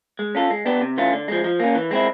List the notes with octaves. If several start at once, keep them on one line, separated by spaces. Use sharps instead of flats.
G#3
C#4 F4 A4
G#3
B3 D4 G4
C3
E3 A3 C#4 F4
D3
F3 G#3
F3
A#3 C#4
E3
G#3 C4 E4